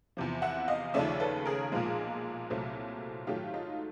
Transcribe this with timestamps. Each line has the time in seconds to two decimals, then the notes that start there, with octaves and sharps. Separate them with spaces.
0.17 E2 C3 F3
0.42 E5 F#5
0.68 D#5 F5
0.94 D#2 C#3 F3 A3 C#4 D5 E5
1.20 A4 B4
1.45 G#4 A#4
1.72 B1 A#2 F3 G#3
2.50 C2 A#2 F#3 A3 C4
3.27 G#2 D#3 F#3 A3 F4 G4
3.54 D#4 F4